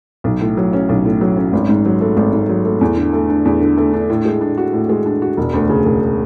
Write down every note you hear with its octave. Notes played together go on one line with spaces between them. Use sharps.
B1
A2
F#3
C#4
B1
A2
F#3
C#4
G#1
G#2
F#3
A3
G#1
G#2
F#3
A3
E2
D3
A3
D4
E2
D3
A3
D4
A2
G#3
D4
F#4
A2
G#3
D4
F#4
E1
D2
C#3
E1